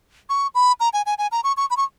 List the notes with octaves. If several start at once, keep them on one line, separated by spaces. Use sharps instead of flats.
C#6
B5
A#5
G#5
G#5
G#5
A#5
C#6
C#6
B5
C#6